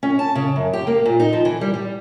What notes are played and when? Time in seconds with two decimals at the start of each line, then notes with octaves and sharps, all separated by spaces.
0.03 C#4
0.19 A5
0.35 C#3
0.56 F#2
0.73 G4
0.87 A#3
1.05 A#2
1.20 D#4
1.33 F3
1.45 E3
1.61 G3
1.74 G3